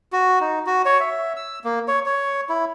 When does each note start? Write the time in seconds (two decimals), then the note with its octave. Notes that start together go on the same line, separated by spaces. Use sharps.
0.13 F#4
0.41 D#4
0.66 F#4
0.86 C#5
1.00 E5
1.36 E6
1.64 A#3
1.88 C#5
2.06 C#5
2.49 E4